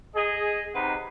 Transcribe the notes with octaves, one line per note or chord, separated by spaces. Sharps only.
G#4 D#5
C3 D#4 B4 C5 F#5 B5